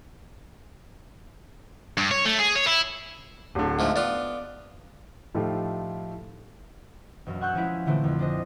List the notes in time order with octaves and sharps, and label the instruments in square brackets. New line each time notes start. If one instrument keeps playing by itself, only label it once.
[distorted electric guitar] G2
C#5
A3
G#4
C#5
E4
[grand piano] D1 D3
[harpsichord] G#2 F3 A3
[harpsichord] B3 F4 [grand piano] D5
[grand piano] A2 F3 A3 D#4 F4 G4
[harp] E1 F#2
F#5 G#5 C#6 E6 F#6 G6
F3 G#3 C#4 E4
A#2 D3 E3 A3 C4
F2
D4 G#4 C5 D#5